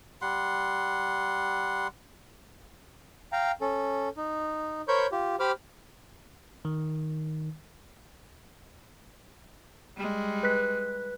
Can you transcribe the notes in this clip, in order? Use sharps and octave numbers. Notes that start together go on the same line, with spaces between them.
G3 F#5 C6
F5 G5 A#5
C#4 A4
D#4
A#4 C5 C#5 B5 C#6 G6
F4 G4
G4 C5 B5 D6 F6
D#3
G3 G#3
B4 F#6 B6